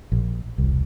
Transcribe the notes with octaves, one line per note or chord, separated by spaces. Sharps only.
A#1
E1 C2